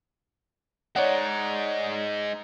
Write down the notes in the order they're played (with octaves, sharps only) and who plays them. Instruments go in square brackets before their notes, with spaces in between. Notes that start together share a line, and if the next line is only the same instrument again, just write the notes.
[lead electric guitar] G#3 D#4 [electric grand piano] C#5 D5 F#5